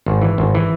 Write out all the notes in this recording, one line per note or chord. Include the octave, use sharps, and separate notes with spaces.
G#1
E3
G#1
E3